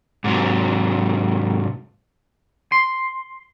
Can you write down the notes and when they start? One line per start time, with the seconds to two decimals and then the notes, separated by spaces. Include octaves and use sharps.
0.24 G#2 C3 F#3
2.72 C6